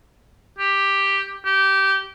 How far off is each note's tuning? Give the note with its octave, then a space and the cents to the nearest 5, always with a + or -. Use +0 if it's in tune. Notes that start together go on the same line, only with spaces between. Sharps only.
G4 +5
G4 -15